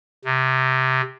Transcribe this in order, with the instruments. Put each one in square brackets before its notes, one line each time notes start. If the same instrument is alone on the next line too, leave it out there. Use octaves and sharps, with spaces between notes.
[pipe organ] C3